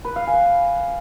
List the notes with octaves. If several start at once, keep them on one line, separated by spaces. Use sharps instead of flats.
B4
F5
G#5